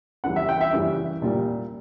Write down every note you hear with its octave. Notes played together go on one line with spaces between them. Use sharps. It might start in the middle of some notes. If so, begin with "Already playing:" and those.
C#3 E3 G3 F#5
E5
G5
E5
C#3 E3 G3
A#2 G3